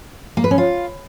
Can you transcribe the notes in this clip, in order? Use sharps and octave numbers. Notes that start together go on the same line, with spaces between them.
A#3
B4
C#4
F4